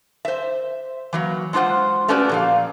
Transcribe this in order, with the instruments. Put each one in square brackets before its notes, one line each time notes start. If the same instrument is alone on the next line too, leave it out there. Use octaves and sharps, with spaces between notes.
[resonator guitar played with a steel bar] C5 E5
E3 F#3 A#3
G#3 D4 F4 C5 F#5
A3 C#4 D4 F#4 G4 B4
A#2 F3 F5